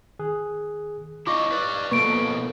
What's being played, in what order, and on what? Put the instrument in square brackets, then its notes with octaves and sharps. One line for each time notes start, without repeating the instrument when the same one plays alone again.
[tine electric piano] D#3 G#4 F#6
[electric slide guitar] D4 E4 D#5 [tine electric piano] F4 [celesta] C#6 D6
[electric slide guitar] B4 D5
[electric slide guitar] B2 F3 [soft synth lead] A#3 [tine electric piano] A4 B4 [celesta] C#6 D7